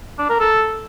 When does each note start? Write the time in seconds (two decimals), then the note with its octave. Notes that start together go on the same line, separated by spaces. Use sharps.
0.19 D4
0.29 A#4
0.40 A4